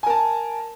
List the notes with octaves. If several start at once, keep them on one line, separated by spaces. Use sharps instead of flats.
A#4 G#5 A5